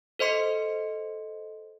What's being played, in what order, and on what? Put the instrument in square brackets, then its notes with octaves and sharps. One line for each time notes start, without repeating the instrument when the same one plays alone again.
[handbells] A4 C5 D#5 C6 C#7